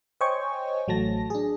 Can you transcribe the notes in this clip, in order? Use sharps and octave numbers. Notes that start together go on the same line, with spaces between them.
C5 C#5 D#5 G5 G#5 C#6
A1 F#3 A3 A5 A#6
D4 G#4